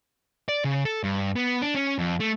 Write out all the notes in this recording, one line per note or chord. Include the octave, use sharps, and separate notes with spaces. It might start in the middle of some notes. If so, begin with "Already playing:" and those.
D5
C#3
A4
G2
B3
D4
C#4
F2
A3